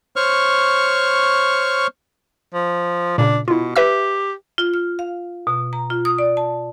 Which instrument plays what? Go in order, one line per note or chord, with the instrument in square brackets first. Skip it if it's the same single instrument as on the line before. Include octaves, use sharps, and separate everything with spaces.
[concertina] C5 C#5 C#6 F6
[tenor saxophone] F3
[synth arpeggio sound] A#2 C#3 [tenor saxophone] D4
[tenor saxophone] B2 [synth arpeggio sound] E4 F4
[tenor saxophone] G4 [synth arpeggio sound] B4 E5 E6
[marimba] F4
F6
F5
B2
A#5
F4
D#6
D5
A5